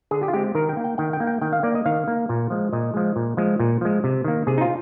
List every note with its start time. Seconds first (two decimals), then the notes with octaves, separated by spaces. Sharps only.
0.11 D3 G#4
0.23 G4
0.28 F4
0.33 G#3 C4 G4
0.55 D#3 A#4
0.69 G5
0.77 A#3
0.84 G5
0.98 D#3 G5
1.13 G5
1.20 A#3
1.27 G5
1.41 D#3 G5
1.53 F5
1.63 A#3 D5
1.75 D#5
1.86 D#3 F5
2.08 A#3
2.29 A#2
2.50 F3 G#3
2.73 A#2 D#5
2.94 F3 G#3
3.16 A#2
3.37 F3 G#3
3.59 A#2
3.81 F3 G#3
4.04 C3
4.24 D#3 A#3
4.47 C3 G#4
4.58 D#4
4.61 F4